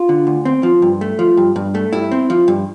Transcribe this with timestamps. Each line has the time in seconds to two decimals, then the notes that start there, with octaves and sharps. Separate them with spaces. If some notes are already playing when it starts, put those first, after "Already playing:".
Already playing: F4
0.09 D3
0.27 D2
0.45 C4
0.63 F3
0.82 G2
1.01 A3
1.19 F3
1.37 G2
1.56 G2
1.75 A3
1.93 G2 E4
2.11 C4
2.30 F3
2.48 G2